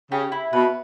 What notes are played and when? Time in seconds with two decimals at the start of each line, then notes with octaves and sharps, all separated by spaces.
0.12 C#3 G4
0.32 E4
0.53 B2 B4